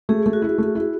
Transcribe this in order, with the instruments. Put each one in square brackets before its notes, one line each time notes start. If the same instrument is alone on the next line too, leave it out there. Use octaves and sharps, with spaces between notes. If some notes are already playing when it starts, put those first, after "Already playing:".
[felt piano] A3 [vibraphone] G#4
[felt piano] A3
[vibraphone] F#4
[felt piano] E4
A3
E4